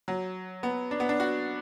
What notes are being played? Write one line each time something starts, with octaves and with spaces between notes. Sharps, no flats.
F#3
B3
D4
B3
D4
F#4